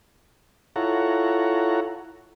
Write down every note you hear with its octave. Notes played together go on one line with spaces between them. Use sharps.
E4 F4 A4 C#5 F#5 A#5